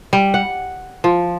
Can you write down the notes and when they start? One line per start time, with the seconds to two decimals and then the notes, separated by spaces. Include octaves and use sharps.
0.13 G3
0.34 F#5
1.04 F3